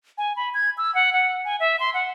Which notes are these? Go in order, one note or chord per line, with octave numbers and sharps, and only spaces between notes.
G#5
B5
G#6
E6
F#5
F#5
G#5
E5
C6
F#5